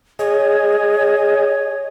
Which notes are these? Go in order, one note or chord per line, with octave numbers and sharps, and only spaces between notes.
G#4 C#5 D#5